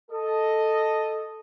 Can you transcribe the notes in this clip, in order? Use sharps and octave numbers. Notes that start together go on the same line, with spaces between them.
A4 D#5